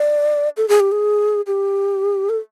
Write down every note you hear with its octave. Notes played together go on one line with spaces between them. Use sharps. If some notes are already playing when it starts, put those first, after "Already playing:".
Already playing: D5
A4
G#4
G4
G#4
G4
A4